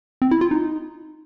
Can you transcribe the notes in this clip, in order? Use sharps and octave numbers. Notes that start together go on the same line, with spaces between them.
C4
E4
F4
D#4